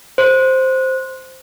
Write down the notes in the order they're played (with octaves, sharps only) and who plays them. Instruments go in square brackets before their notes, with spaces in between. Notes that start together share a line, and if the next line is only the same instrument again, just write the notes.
[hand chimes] C5